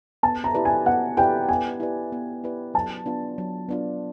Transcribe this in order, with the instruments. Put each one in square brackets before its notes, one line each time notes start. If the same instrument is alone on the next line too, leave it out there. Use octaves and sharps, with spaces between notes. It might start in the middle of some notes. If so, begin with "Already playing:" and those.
[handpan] B3 [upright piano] A5
[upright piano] A#5
[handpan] E4 G4 B4 D5
[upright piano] G#5
[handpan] B3 [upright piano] F#5
[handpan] E4 G4 B4 D5 [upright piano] G5
[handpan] B3 [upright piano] G#5
[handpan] E4 G4 B4 D5
B3
E4 G4 B4 D5
[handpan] F#3 [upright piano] A5
[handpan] B3 D4 F4
F#3
B3 D4 F4